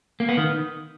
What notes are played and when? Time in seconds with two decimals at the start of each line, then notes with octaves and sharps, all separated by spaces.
0.20 A#3
0.29 B3
0.37 D#3